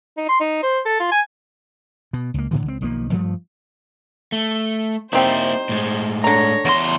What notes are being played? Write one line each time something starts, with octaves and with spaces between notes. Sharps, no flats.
D#4
C6
D#4
C5
A4
F4
G#5
B2
C#2 A#3
A2 D3 E3
C#2 C4
B1 D#3 F3 A#3
G2 F3 G3 A3
A3
G3 A#3 C4 D#4 E4 C5
A2 G#3
D3 C#5 A#5 A#6
E2 C6